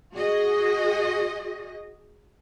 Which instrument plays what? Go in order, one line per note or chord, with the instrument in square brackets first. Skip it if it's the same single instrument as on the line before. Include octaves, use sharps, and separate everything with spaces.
[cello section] F#4 G#4 D#5